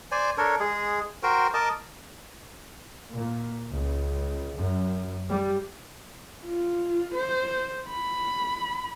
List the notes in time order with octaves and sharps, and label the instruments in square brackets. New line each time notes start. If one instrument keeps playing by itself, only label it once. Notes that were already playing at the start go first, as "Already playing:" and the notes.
[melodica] C5 D5 G#5
D4 A4 A#4 C#5
G#3 G#4
F#4 A#4 C5 G5
A#4 D#5 A5 D6
[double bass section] A#2
C#2
F#2
G3
[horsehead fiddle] F4
C5
B5